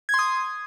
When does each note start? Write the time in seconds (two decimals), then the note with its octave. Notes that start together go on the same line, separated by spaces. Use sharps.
0.09 G#6
0.14 C6
0.19 D#6